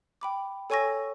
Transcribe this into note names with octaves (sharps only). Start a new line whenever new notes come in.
G5 B5 D6
A4 C#5 G#5 C#6 E6 A#6